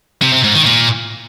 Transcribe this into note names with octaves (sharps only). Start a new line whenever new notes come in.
C3
C3
G#2
D#3
A#2